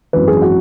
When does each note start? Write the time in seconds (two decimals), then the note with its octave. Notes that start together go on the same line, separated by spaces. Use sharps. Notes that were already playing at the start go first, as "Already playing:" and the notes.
0.13 G#1 F#2 E3 B4
0.28 G#4
0.42 F#4